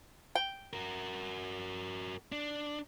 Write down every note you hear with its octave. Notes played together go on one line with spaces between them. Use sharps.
G5
F#4 A#4
D4